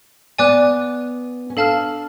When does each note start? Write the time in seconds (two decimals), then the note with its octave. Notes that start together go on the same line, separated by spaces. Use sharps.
0.39 B3 D5 G#5 D6 F#6
1.50 C#4
1.57 D4 A4 F5 A5 F6